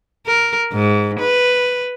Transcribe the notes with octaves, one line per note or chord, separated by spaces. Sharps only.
A#4
G#2
B4